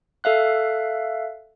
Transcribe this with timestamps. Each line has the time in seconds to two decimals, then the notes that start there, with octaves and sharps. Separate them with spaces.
0.24 A4 E5 F5 F#6